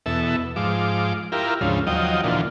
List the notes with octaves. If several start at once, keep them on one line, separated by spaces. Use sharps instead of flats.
E2 B2 A4 E5
G#2 F3 D6
E4 F4 G4 A#4
D2 G#2 C#3 F3
D#2 F3 F#3 D#5 G5
A#2 D3 E3 F3